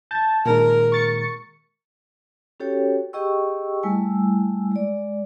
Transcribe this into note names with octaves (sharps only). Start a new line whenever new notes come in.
A5 G6 A6
A#2 D#3 G#3 A#4
C#6 A6 C#7
C#4 F#4 G4 A4 C#5 G5
G4 G#4 D#5 G5 C#6 E6
G3 A3 E4 G#5 E6
G#3 D5